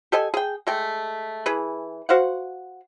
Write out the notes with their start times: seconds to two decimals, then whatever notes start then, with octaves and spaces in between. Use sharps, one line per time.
0.12 G4 A4 D#5 G#5
0.34 G#4 G5
0.67 G#3 A3 G5
1.46 E3 G#4 B4
2.09 F#4 C5 F5 F#5